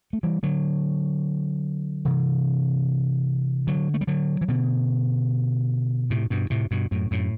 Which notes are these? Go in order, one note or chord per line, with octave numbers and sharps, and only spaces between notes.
A3
E3 G3
D3 F#3
C3 E3
D3 F#3
A3
G3
D3 F#3
E3
B2 D3
A2 C3
G2 B2
A2 C3
G2 B2
F#2 A2
F#2 A2